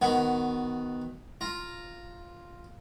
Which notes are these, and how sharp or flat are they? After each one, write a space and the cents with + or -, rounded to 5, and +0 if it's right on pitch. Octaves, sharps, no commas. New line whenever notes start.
D#3 +0 B3 +15 F#4 +0
F4 +0 A#5 +0